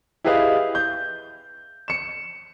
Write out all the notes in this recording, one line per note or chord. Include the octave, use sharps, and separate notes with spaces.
E4 G4 G#4 B4 D#5 F5
G6
C#7 E7